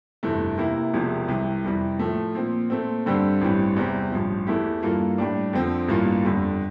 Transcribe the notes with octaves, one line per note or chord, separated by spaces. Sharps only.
G1 F2 C3 E3 A3
C3 E3 A#3 E4
E1 E2 C3 F3
C2 C3 E3
F2 C3 E3 G3
A2 F3 A3
A#2 F3 C4
A#2 A3 C4
G2 D3 G3 C4 G4
A1 G2 E3 G3 C4
E2 C3 G3 C4 G4
A1 G2 F3
E2 E3 A3 E4 G4
G2 E3 A#3 F4 A4
A2 G3 D4
F2 D3 F3 C4
A1 G2 E3 A#3 F4
G1 F2 D3 G3